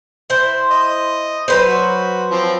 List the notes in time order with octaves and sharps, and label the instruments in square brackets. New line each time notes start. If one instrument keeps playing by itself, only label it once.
[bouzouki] E4 C5
[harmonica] D#5
[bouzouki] F#3 B4 C5
[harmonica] F#4
F3 C4